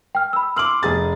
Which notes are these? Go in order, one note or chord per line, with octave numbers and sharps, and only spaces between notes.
G5 F6
B5 E6
C6 D6 E6 F6 F#7
F1 G#4 A6